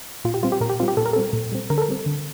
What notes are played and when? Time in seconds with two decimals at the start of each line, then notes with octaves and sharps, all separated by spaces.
0.25 A#2 F4
0.34 G4
0.43 G3 C4 F4
0.52 G4
0.61 A#2 A#4
0.70 G4
0.80 G3 C4 F4
0.88 G4
0.97 A#2 A4
1.06 A#4
1.13 G3 C4 A4
1.33 A#2
1.52 G3 C4
1.70 D3 A#4
1.78 A4
1.82 A#4
1.89 G3 C4
2.06 D3